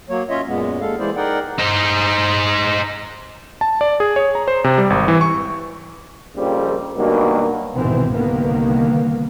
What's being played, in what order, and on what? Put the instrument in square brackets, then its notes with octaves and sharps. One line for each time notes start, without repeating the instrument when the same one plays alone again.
[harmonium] F#3 A#3 C#5
C#4 F4 C#5 D#5 E5
F#2 A#2 G#3 B3
D#2 G#3 A4 F5
E3 G#3 E4 G#4 C5 D5
D#4 G#4 A#4 D5 F#5 G5
[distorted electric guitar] D#4 C5
[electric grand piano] A5
D5
G#4
C#5
A#5
C5
C3
G3
G#1
E3
C#6
[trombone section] A#1 F2 C#3 G3 A#3 C4
G2 B2 D#3 F#3 A#3
[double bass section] C2 G#2 B2 D#3 E3 C4
C2 D3 D#3 A#3 B3